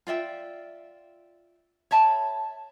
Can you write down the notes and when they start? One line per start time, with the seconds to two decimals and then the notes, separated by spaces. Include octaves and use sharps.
0.07 F4 D5 E5 G5
1.91 C#5 E5 A5 B5